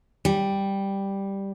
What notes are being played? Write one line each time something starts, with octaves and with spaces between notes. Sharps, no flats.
G3